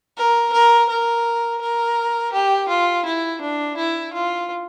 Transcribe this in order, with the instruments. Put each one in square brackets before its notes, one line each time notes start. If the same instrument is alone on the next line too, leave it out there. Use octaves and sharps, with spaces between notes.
[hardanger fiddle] A#4
A#4
A#4
A#4
G4
F4
E4
D4
E4
F4